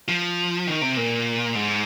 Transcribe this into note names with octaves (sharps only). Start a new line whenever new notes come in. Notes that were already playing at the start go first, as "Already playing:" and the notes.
F3
D#3
C3
A#2
G#2